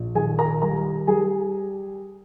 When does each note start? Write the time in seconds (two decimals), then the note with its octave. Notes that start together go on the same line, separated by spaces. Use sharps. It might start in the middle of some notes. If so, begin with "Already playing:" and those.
Already playing: A#1
0.15 D#3 G#4 G#5
0.39 A#4 A#5
0.62 G3 A#4 A#5
1.07 G3 G#4 G#5